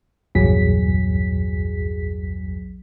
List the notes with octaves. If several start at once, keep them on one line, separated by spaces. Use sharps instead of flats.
A#1 E2 G2 F#3 G#4 B6